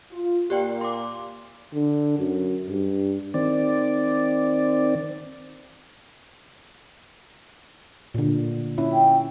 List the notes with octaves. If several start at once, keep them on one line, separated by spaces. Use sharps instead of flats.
F4
A#2 A#3 G4 D5 G5
C6 D6
D3
F#2
G2
D#3 C4 D5
A#2 D3
C#4 E4
G5